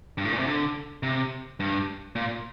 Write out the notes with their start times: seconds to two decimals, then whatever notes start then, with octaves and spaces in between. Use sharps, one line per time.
0.18 G2
0.25 A2
0.32 A#2
0.39 C3
0.46 D3
1.03 C3
1.60 G2
2.16 A#2